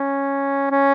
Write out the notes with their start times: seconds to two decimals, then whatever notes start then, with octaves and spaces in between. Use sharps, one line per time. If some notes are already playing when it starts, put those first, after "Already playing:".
Already playing: C#4
0.71 C#4